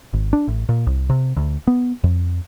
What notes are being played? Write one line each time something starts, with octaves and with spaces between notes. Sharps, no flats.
G#1
D4
A1
A#2
C2
C3
D2
B3
F2